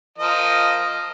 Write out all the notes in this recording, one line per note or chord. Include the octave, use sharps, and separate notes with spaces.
F3 A#4 D#5